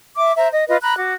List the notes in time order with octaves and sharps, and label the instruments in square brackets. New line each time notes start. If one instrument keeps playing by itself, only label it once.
[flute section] E5 D6
C5 E5 A#5
D#5
F4 B4 D#5
A#5 B5 F#6
F#4 D6